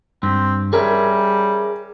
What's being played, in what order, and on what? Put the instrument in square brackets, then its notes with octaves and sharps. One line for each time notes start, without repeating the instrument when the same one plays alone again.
[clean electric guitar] G2 [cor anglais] C4
[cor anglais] G3 [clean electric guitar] G#4 C#5 E5 [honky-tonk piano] A#4